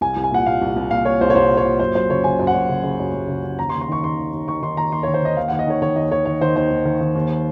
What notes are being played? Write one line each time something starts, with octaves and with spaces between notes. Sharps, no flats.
C2 G#5
C2
G#5
A#2 F#5
A#2 F5
C2
C2
A#2 F5
A#2 C#5
C2 C5
C#5
C2 C5
A#2
C#5
A#2
F#2 C5
F#2 C5
C#3 C#5
C#3 G#5
F#2
F#5
F#2
C#3
C#3
F#2
F#2
C#3
C#3
D#2 A#5
C6
D#2
C6
D#3 C#6
D#3 C6
D#2
D#2
D#3 C#6
D#3 C6
D#2 A#5
D#2 C6
D#3 C#5
C5
D#3 D#5
D#2 F5
D#2 F#5
D#5
D#3 C#5
D#3 C#5
D#2 D#5
D#2 C#5
D#3 C#5
D#3 C5
D#2 C5
D#2
D#3
D#3
D#2